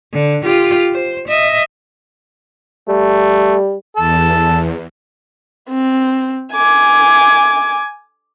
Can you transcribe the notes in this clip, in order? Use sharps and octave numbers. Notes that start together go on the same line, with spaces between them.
D3
F4 G4
C5
D#5 E5
G3 A3
E2 A4
C4
G#5 D6